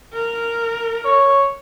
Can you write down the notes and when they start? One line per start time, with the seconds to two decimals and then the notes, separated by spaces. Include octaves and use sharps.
0.14 A#4
1.05 C#5